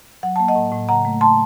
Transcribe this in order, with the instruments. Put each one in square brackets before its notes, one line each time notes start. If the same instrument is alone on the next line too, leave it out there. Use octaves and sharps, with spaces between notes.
[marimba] F#3 F#5
A#3 A5
D#5 F#5
A2
A2
C#3 F#5 A#5
A3
A5 C6